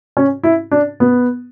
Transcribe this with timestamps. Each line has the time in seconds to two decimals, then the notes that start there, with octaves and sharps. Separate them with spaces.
0.17 C#4
0.43 E4
0.71 D4
1.00 B3